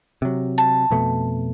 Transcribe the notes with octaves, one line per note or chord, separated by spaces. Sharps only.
C3 F#3
A5
F2 B2 A3